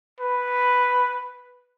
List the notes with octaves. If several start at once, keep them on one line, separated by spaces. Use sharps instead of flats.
B4